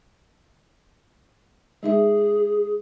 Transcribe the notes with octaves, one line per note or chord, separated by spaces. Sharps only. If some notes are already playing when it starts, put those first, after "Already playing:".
G#3 D#4 G#4 E5